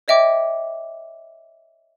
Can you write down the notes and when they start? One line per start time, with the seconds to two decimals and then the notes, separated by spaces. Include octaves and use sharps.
0.08 C#5 D#5 E5 G5 D6